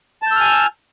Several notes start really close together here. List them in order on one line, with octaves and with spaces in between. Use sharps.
A5 G6 E6 F6 G#5